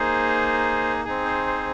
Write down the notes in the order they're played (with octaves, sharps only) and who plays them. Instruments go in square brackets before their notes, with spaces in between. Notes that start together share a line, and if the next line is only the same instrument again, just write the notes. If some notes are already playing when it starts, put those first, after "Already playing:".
Already playing: [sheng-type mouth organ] A#3 D#4 G#4 C5
C4 D#4 G#4
C5
C5